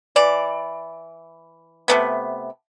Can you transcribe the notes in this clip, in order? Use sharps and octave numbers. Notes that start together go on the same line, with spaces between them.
E3 D5
C3 A3 B3